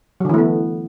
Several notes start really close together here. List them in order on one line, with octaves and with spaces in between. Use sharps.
F#3 D3 E3 A3 B3